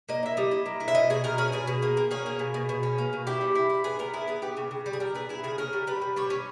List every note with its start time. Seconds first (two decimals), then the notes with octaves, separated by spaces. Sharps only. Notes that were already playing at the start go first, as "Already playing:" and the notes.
0.09 A#3 D#5
0.23 E4 E5
0.37 G3 D#5
0.52 E4
0.66 A#3
0.80 E4
0.88 E5
0.95 B2 D#5
1.10 B2 G#4
1.24 B2 A#4
1.38 C#4 G#4
1.52 B2 G#4
1.67 B2
1.82 A#3
1.97 A#3
2.11 C#4 G#4
2.26 A#3
2.39 B2
2.54 B2
2.69 B2
2.83 C#4
2.98 A#3
3.13 B2
3.27 E4 G4
3.41 G3
3.55 E4
3.70 E4
3.84 B3 G#4
3.99 B3 A#4
4.14 E4 G#4
4.28 B3 G#4
4.42 B3 G4
4.57 C#3
4.71 C#3
4.86 G3
4.93 G#4
5.00 G3 A#4
5.15 B3 G#4
5.29 E4 G#4
5.44 C#3 G#4
5.58 C#4 A#4
5.73 G3
5.87 G3 B4
6.02 G3
6.16 G3 C#5
6.30 C#4